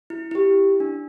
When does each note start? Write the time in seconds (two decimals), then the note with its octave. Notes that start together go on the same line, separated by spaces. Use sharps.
0.10 E4
0.31 E4
0.35 G4
0.80 D4